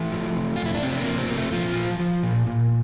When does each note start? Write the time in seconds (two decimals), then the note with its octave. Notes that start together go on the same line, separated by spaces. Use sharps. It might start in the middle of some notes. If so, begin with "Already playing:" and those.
Already playing: E3 A3 A4
0.12 F3
0.35 C3
0.56 F2 F4
0.66 E4
0.74 D4
0.82 F2 C3 C4
0.92 A3
1.00 A#3
1.06 F3
1.18 C3 C4
1.30 C3 A#3
1.35 A3
1.52 A#2 F3 F4
1.76 F3
2.00 F3
2.23 A#2
2.47 A#2